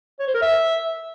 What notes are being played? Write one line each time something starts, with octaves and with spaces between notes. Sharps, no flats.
C#5
C5
A#4
E5